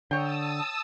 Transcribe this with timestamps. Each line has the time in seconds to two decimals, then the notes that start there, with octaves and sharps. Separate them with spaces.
0.11 D3 C#5 G5 A5 D#6 E6